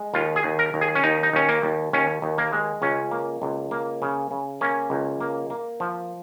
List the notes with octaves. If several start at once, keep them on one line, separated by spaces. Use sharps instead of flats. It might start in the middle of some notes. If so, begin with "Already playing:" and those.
Already playing: G#3
D#2 F4
G#4
D#2
A#4
D#2
G#4
C#4
D#2 D#4
D#4
D#2 C#4
A#3
D#2
D#2 C#4
D#2
A#3
G#3
C#2 C#4
A#3
C#2
A#3
C#3
C#3
A#3 C#4
C#2
A#3
A#3
F3